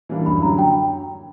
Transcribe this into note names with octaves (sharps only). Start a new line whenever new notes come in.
E3 G3 A#3 D4
F#2 B5
D3 F#3 A#5
G5